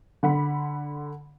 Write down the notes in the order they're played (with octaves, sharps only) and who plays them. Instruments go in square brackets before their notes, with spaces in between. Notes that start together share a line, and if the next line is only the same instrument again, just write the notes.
[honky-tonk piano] D3 F#5 B5